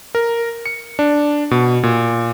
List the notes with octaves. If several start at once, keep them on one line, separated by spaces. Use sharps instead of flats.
A#4
C#7
D4
B2
A#2